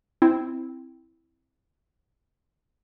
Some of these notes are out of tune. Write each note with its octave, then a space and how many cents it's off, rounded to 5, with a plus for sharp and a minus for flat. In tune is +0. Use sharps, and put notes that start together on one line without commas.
C4 +0 E4 +0